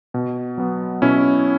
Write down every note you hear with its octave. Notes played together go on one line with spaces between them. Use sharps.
B2
F#3 B3
B2 C#4 E4